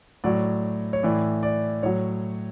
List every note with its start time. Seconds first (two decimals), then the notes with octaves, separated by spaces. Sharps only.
0.24 A2 F#3 D5
0.93 C#5
1.03 A2 E3 D5
1.43 D5
1.83 A2 F#3 C#5